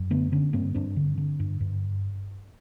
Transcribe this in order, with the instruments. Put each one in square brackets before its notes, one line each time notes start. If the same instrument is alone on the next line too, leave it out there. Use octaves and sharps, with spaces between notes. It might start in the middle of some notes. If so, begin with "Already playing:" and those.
Already playing: [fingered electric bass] F#2
D3 A3 B3
D3 B3 C#4
G2 A#3 C4
G2 C4 D4
D3
D3
G2
G2